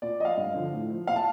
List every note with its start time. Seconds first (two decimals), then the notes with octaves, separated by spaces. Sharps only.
0.02 A#2 D5
0.19 F3 D#5
0.25 F5
0.37 G2
0.54 D3 F3
0.73 A2
0.90 F3
1.07 A#2 F5
1.16 A5